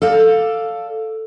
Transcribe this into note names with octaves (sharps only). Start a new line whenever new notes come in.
A4 D5 F5